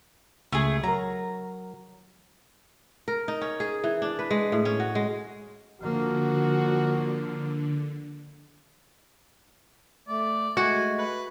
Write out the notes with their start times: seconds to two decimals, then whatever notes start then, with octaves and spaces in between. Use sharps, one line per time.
0.52 C#2 A3 G#4
0.84 F#3 A#4 A#5
3.08 A#4
3.28 D#4
3.41 C#4
3.60 G#4
3.84 E3
4.02 D4
4.19 B4
4.31 G#3
4.52 A2
4.65 C#4
4.80 F#4
4.95 G#3
5.81 D3 F3 A#3 F#4
10.08 A3 D5
10.57 G#3 A3 F#4 G#5
10.98 B4